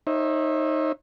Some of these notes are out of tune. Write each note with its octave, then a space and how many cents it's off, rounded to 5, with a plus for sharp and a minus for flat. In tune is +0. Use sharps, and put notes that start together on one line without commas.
D#4 +0 C#5 -45 E5 +0